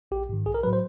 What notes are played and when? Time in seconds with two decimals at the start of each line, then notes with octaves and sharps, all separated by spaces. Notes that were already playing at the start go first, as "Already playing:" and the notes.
0.11 A#1 G4
0.29 G#2 D#3
0.46 B1 G#4
0.54 A#4
0.63 A2 F#3 B4
0.73 C5